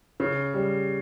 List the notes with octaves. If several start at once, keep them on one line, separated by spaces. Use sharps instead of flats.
C#3
G3